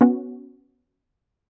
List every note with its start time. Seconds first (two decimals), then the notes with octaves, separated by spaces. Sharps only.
0.01 B3 C#4 F#4